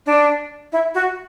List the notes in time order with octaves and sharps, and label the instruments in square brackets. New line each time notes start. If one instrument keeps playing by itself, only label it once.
[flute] D4
E4
F#4